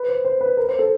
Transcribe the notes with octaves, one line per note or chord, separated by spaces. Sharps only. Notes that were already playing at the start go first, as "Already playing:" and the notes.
Already playing: B4
C5
C5
B4
A#4
C5
A4